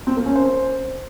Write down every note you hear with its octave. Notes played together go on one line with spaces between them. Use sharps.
C4
A#3
C#4
C5